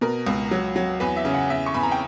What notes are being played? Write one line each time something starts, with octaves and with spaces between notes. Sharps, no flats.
B2 A#4
C#2
F#3
F#3
E2 B4
E5
C#3
F#5
E2 E5
C#6
E2 B5
A#5
G5